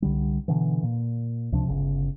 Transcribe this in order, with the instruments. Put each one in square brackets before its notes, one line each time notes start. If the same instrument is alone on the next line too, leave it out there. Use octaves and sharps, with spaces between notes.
[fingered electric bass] C2 D3 G3
B2 D3 E3
A#2
C#2 C3 F3 D4
G1 C#3